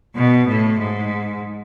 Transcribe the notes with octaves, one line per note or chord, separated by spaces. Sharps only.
B2
A2
G#2